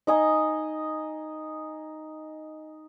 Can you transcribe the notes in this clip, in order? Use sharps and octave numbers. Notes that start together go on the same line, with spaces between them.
D#4 D#5 G#5